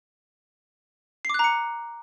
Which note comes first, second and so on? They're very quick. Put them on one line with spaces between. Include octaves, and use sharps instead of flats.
C7 D6 F#6 A#5 C#7